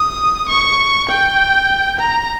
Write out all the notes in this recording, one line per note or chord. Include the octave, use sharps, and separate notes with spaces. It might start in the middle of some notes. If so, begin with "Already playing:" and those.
Already playing: D#6
C#6
G5
A#5